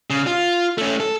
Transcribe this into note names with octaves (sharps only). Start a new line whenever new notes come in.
C#3
F4
A3 C#4
A4